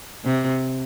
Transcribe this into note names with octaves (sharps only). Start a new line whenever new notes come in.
C3